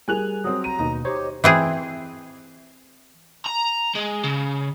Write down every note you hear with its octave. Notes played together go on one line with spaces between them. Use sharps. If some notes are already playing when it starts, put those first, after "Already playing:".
G3 G#4 A#4 G#5 F#6 F7
F#3 C4 D#6
A#5 D#7
D#2 B2 D#4
G4 C5 C#5
E3 C4 G#4
A#5
G#3
C#3